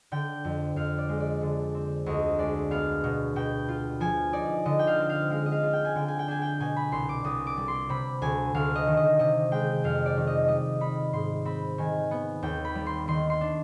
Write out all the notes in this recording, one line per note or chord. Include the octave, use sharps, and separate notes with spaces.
D3 G5
F2
F2 F5
D5
G#3
D5
D3
C4
D2 D#5
G#3 D5
B3 F5
B2
B2 G5
F4
F3 G#5
D#4 D5
D3 D#5
G5
F5
C4
F5
G#3 F5
D#5
F5
F4
G5
G#5
D3 G5
G#5
G5
D4 G#5
G5
B2 G#5
B5
C2 C6
D6
C2 D#6
D6
G3
C6
C3 B5
D2 G#5
D2 F5
D#5
D#3
D#5
C3 D#5
G#3 G5
F2 F5
D5
D#3
D#5
G3 D#5
D#4 B5
G#2 C6
C4 B5
D#3 G#5
B3
D#2 G5
B5
G3
C6
D#3 C6
C6
D4